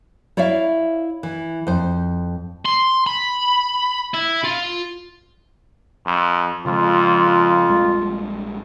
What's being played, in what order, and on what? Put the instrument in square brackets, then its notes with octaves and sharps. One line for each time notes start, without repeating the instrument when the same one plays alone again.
[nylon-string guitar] E4 C#5 D5 E5 F5
E3
F2 C5
[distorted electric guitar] C6
B5
E4
F4
[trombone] F2
[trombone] F2 [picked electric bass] C#3 F3 G#3 [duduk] F4
[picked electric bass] A#1 G3 G#3